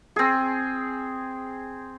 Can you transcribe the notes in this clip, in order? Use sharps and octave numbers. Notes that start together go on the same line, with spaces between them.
C4 G#4